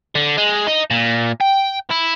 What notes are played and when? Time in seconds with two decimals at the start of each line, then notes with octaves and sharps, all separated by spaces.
0.15 D3
0.38 G#3
0.67 D#4
0.91 A#2
1.41 G5
1.91 E4